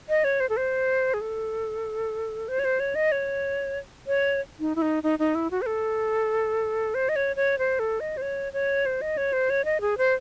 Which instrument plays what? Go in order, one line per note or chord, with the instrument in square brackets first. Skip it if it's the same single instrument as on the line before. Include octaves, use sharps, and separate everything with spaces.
[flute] D#5
C#5
C5
A4
C5
G#4
A4
C5
C#5
C5
C#5
D#5
C#5
C#5
D#4
E4
D#4
D#4
D#4
E4
F#4
C5
A4
C5
D#5
C#5
C#5
C5
A4
D#5
C5
C#5
C#5
C5
D#5
C#5
C5
C#5
D#5
G#4
C5